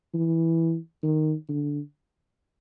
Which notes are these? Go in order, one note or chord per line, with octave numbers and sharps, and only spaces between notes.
E3
D#3
D3